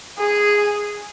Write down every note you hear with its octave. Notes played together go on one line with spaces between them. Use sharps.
G#4